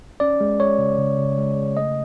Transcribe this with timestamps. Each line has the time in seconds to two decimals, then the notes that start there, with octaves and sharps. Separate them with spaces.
0.20 C#4 D5
0.41 G#3
0.60 G#3 C#5
0.79 C#3
0.98 C#3
1.18 C#3
1.38 G#3
1.57 C#3
1.77 A3 D#5